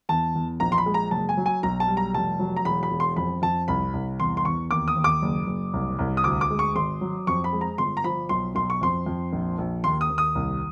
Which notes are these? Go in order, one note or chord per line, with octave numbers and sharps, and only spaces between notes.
E2 A5
E2
A#1 A#5
C6
B5
G#3
A#5
F#1 A5
G#5
F#3
G#5
B1 A#5
A5
G3
A#5
F1 A5
F#3
A#5
E1 B5
B5
E1
C6
F2 B5
F2 A5
C2 B5
C2
E2 C6
C6
E2 C#6
D#2 D6
D#6
D#2
D6
F#1
F#1
C2
C2
D#6
D2 D6
D6
G#3
C#6
G#1 C6
F#3
F2 C#6
B5
G#3
A#5
G1 C6
A#5
F3 B5
B1 C6
B1 C6
C#6
F2 C6
F2
A#1
A#1
D#2 C6
D#6
D#2
D#6
C2